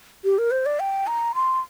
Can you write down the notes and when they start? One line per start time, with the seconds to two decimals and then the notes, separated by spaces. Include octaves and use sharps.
0.24 G4
0.38 A#4
0.51 C5
0.66 D5
0.80 G5
1.07 A#5
1.35 C6